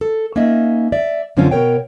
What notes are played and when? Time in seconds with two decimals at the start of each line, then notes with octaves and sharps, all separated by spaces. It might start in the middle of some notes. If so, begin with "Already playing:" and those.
0.01 A4
0.36 A#3 C#4 D#4 D#5 E5
0.92 D5 E5
1.37 F#2 D3 F3 C4 C#4 F4
1.51 B2 A#4 C#5 G5